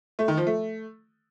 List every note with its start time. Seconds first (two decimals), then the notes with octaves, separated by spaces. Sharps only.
0.19 A3
0.28 D#3
0.37 F3
0.47 A3